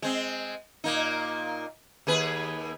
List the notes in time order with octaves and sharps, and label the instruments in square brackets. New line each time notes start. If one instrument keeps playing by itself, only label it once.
[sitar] G#3 C4
A#2 A#3 D#4
D#2 G#4 B4